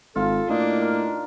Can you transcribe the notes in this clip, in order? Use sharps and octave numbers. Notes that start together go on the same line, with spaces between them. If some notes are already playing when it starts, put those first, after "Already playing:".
G#1 F4 A4
A2 A#3 D4 D#4
A#4